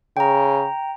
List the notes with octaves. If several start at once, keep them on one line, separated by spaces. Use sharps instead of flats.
C#3 G5 A#5